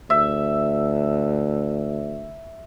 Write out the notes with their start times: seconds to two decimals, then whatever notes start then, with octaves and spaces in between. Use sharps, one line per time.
0.10 D2 E5